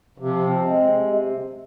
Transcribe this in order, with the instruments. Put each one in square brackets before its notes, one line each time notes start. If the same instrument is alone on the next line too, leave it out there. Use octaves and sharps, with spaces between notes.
[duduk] C3 [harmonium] F3
[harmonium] C4
G#3
C3